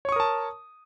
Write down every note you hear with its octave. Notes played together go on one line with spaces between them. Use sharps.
A#4 C#5 A5 C#6 D#6